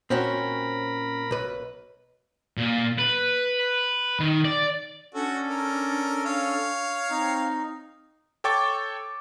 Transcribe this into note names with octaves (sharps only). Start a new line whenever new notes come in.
A#2 C4 C#4 F#4 A#4 B5
B1 B4
A#2
B4
D#3
D5
C#4 D4 F#4 A4
A#4
C#5 F5
C4 D#4
A4 C#5 G5 C#6 D6 A6